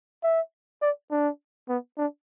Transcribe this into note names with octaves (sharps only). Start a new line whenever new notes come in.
E5
D5
D4
B3
D4